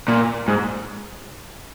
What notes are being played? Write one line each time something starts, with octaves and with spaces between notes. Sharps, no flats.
A#2
G#2